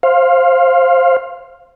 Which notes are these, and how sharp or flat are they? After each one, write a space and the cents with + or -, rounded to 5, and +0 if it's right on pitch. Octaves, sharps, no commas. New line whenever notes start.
C5 +15 F5 +0